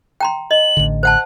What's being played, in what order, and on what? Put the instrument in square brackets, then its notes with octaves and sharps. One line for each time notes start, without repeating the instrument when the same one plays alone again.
[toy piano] G5 A#5 C6
[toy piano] D#5 [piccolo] F#7
[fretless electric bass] A1 D3
[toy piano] C5 F#5 A5 [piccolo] F#6